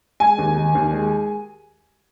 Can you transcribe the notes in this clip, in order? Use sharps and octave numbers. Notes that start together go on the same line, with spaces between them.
G#3 G#5
D#2
D#3
D#2
G#3